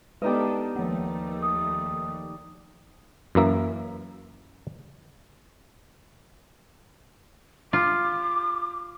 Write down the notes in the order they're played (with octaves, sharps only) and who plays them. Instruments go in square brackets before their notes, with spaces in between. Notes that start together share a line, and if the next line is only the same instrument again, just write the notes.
[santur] G3 D#4 D#5 [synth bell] G#3 [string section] B3 D4 A4 [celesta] B4
[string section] D#2 A3 [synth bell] F3 A#3
[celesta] D#6
[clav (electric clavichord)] F#2 E3 A#3 E5
[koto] F4 [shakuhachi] D6